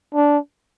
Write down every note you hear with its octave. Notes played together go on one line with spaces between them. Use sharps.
D4